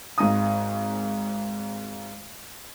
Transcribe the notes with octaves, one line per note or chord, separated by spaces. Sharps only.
G#1 G#2 A#5 D#6